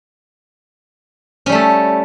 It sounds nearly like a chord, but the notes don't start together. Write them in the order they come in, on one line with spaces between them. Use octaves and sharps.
C#4 G3 A3 A4